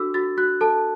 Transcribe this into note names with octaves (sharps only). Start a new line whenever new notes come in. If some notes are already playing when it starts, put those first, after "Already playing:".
Already playing: D4 F#4 A4 D6 E6
F#4 A6
F#4 F#6
A4 A5